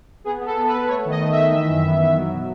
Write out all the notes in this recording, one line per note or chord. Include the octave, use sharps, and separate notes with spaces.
B3 G#4
B3 A4
B3
B4
B3
A3 C#5
D#3
D#5
A3
E5
D#3
E3
F#2
B3
B3
F#3
B2